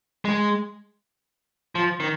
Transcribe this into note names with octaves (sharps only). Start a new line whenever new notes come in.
G#3
F3
D#3